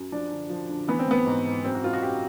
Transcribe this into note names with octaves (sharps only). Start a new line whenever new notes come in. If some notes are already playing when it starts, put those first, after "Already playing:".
Already playing: F#2
F3 D4
D3
F3
D3
E3 B3
C4
E3 B3
G#2
G#2
F#2 C4
F#4
F#2 F4
F#4
F#2 G4